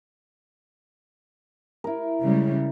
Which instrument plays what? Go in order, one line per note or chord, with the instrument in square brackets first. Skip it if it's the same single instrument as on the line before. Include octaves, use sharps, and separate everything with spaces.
[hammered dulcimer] E4 A#4
[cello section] C#3 G3 G#3